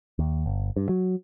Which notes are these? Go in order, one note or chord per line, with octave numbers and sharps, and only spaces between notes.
D#2
G1
G2
F#3